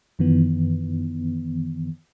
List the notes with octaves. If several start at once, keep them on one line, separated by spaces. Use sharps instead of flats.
F#2 D#3 E3 B3